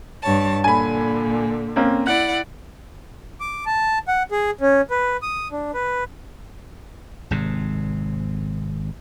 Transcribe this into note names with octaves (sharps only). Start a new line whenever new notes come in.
G2 C#5 A5
A#2 D3 G#5 B5
A#3 C4 C#4
E4 D5 F#5 F#6
D6
A5
F#5
G#4
C#4
B4
D#6
D4
B4
G#1 G#2 C3